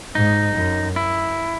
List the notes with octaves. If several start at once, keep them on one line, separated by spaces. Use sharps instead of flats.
G#2 D#4
F#2
E4